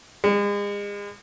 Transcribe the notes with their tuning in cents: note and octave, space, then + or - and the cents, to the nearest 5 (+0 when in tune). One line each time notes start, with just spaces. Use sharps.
G#3 -35